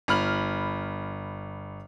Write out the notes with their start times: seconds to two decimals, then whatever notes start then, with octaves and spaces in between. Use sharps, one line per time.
0.08 G1 B5 F6 F#7